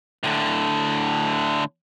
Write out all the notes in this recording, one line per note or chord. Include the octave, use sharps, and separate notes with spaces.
A2 D3